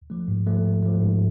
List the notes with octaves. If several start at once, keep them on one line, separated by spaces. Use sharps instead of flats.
F3 A3
G#2
F3 A3
G#2
F3 A3
G#2